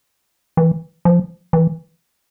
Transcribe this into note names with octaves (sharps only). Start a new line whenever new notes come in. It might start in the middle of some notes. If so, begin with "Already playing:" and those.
E3
F3
E3